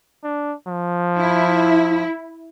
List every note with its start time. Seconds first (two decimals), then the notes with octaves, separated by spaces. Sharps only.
0.24 D4
0.68 F3
1.17 E4